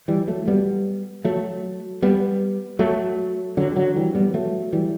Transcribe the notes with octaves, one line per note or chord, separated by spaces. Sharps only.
E3 G3
F#3 A3
G3 B3
F#3 A3
G3 B3
F#3 A3
D3 F#3
G3
D3 F#3
E3 G3
G3 B3
F#3 A3
E3 G3